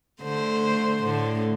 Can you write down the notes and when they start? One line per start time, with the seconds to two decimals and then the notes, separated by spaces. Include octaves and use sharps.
0.22 D3 A3 C5
1.04 A2 D3